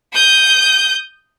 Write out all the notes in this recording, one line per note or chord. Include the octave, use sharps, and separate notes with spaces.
D#6 G6